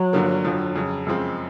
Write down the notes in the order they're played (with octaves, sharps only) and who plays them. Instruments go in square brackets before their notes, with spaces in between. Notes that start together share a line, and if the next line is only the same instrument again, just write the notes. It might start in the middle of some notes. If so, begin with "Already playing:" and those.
Already playing: [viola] F#3
[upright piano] G2 D3 F3 A#3
F2 D3 F3
F2 C#3 F#3
F#2 C#3 F3 G#3 C4